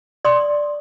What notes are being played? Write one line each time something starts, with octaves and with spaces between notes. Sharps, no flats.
D5 C6 D#6